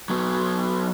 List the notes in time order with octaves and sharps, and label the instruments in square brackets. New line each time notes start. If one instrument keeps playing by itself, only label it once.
[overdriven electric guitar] F#3 B3